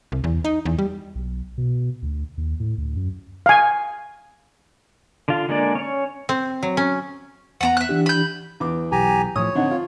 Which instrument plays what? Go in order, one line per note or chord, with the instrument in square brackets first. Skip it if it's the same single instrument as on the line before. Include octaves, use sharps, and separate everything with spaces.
[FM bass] C2
E2
D#4
E2
G3
[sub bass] B1
B2
D2
D#2
A2
D2
F#2
[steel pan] F5 G#5
[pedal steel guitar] D3 F4
D3 G#3 A#3 D4 D5
C#4 C#5
[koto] C4
F#3
C#4
[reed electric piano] E2 B3 [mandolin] F#5 A5 A#5
[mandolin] E5 F#6
[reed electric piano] E3 D4 G4
[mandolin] B5 G6
[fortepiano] E2 D6
[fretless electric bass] B1 [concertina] G4 G#5 A#5
[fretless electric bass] A2 F3 [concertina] C#5 [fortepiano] D#6
[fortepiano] D3 D#4 F#5 [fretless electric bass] C4
[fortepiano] F4